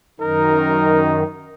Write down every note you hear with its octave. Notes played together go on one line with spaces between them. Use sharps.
F#2 D#3 D#4 A#4